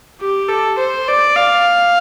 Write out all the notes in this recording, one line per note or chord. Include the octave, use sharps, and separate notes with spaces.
G4
A4
C5
D5
F5